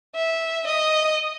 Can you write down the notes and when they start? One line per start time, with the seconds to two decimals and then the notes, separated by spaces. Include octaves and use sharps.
0.15 E5
0.67 D#5